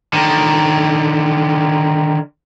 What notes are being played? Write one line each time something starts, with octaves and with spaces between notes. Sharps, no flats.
D3 D#3